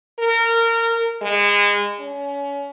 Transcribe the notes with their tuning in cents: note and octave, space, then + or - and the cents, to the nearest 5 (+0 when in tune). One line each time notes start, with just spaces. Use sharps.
A#4 -20
G#3 -25
C#4 +30